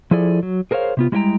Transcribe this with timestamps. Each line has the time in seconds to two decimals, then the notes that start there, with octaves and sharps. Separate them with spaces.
0.11 F3 E4 G#4 A4 D5
0.43 F#3
0.71 G#4 A#4 C5 C#5 F5
0.97 C3 B3 F4
1.12 G3 G#3 E4 D#5 G5 A#5